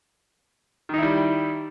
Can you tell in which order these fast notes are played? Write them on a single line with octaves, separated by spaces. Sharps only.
D#3 D#4 E4 G3